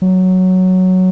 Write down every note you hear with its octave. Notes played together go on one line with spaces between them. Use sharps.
F#3